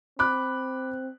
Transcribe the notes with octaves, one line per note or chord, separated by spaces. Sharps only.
C4 B5 D6 F#6